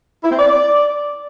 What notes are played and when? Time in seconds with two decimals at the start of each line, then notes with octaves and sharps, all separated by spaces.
0.24 E4
0.31 C4
0.39 D5